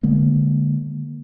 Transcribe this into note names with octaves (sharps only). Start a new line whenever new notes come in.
D3 G#3 A#3